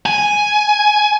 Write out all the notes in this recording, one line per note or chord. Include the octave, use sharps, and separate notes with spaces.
G#5